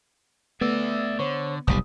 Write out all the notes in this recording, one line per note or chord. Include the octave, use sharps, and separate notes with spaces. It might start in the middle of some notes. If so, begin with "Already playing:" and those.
A3 B3 D5 E5
D3 C5 C#5 C#6
F1 B1 G3 D#6